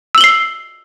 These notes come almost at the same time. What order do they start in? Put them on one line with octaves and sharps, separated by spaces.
E6 F#7 G7 C7